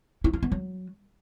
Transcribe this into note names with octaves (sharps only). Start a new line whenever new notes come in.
E4
F4
B3
F#3